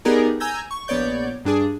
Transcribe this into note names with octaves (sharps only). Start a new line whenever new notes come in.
B3 D#4 G4 G#4 A#4 D5
G#5 A#5 E6 G6 G#6 A#6
C#6
A#1 B3 C#5 D5 G6
G2 D4 G#4